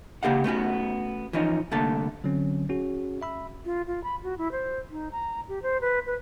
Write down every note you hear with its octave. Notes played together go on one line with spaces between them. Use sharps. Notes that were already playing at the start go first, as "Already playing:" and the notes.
C#3 A#3 G4 G#4 F5 F#5
A3 B3 C#4 F#4
E3 F3 C#4 D#4
C2 D3 A3 A#3 A5
D3 F#3 C4 C#4
C#4 F#4 G#4
E5 B5 E6
F4
F4
B5
F#4
E4
C5
D#4
A#5
G4
C5
B4
B4